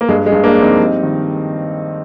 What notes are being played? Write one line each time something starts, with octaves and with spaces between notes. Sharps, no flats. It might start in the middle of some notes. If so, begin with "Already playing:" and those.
A#3
G2 G#3
G#3
G2
A#3 D4
F3
C4 D#4
G3
D#3